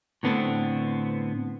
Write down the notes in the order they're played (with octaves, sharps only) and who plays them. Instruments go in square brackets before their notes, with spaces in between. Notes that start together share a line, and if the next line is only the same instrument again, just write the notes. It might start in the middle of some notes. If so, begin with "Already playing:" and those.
[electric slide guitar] A2 D3 B3 C4